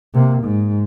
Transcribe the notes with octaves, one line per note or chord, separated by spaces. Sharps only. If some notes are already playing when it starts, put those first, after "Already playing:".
C3 A#3
G#2